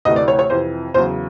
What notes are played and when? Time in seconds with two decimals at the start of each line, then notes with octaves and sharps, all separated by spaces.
0.05 D2 C3 E3 A3 D#5
0.16 D5
0.28 C#5
0.39 C#5
0.50 F2 C3 E3 C5
0.94 E2 C#3 F#3 C5